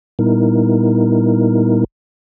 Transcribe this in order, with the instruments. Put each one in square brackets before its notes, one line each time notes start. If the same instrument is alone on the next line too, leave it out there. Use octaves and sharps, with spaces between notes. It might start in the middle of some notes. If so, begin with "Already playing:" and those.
[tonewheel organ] A#2 G3 B3 D#4 E4 A#4